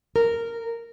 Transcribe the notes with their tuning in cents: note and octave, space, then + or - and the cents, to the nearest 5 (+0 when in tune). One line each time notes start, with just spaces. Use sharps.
A#4 -10